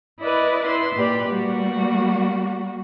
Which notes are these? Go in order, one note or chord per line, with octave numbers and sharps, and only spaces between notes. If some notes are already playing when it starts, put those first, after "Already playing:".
E4 B4 D5 D#5
E4 C6
A#2 G4 B4 D5
G3 A#3 F#4